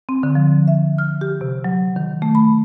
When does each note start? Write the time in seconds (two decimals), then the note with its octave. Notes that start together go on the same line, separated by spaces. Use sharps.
0.09 C4
0.23 D3
0.35 F3
0.68 E5
0.98 F6
1.21 G4
1.41 C3
1.64 F#3
1.96 D#3
2.22 A3
2.35 B5